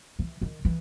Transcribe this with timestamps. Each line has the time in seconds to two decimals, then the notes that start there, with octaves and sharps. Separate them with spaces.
0.19 E3
0.41 D#3
0.65 E3